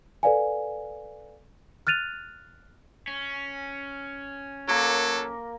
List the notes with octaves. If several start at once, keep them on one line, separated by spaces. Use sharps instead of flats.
A4 B4 D5 F5 G#5
F6 F#6 A6 D#7 F7
C#4
F#3 A#3 A4 A#4